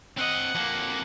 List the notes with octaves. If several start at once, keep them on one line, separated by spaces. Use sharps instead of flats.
C4 D#5 F#5
F2 A#3